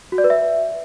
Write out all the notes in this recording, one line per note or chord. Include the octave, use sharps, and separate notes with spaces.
F#4
D5
B4
E5